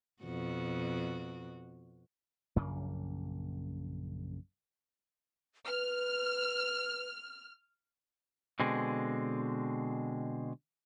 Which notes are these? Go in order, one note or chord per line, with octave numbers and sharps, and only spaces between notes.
F2 B2 F#4
A#1 F#2 C#3 A#3
B4 F6
B2 D3 G#3 C4